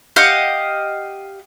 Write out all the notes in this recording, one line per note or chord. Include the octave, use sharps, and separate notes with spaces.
G4 D#5 F5 F#5